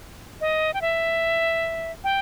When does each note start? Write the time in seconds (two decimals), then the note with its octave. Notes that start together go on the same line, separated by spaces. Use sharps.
0.41 D#5
0.74 G5
0.81 E5
2.04 G5